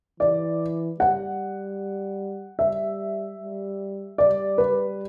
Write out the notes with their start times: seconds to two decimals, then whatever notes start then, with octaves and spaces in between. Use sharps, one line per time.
0.20 E3 D5
1.00 G3 F#5
2.59 G3 E5
3.39 G3
4.18 G3 D5
4.58 B4